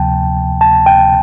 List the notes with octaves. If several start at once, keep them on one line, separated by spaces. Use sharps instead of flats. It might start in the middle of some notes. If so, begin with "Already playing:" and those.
Already playing: D2 C3 F3 G5 A5
A5
G5